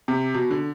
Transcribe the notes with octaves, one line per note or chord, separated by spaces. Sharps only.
C3
B2
D3